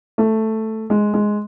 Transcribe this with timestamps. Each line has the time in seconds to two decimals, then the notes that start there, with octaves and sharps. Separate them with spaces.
0.18 A3
0.90 G#3
1.14 G#3